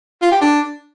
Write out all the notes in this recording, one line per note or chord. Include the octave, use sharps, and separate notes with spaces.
F4
G4
D4